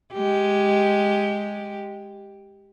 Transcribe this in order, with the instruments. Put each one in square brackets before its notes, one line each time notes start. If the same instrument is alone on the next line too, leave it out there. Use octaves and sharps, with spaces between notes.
[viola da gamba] G#3 G4